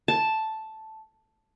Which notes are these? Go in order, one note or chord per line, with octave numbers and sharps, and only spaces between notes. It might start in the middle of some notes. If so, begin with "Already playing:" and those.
A5